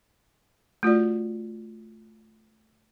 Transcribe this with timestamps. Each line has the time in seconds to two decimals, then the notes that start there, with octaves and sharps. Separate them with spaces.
0.83 A3 F4 F#4 D5